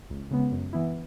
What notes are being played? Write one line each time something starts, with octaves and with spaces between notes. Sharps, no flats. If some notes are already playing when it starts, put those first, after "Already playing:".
C#2
C#3 G#3 B3
F#2
E3 B3 E4